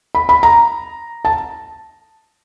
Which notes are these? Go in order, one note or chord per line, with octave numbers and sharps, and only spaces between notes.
B5
B5
A#5
A5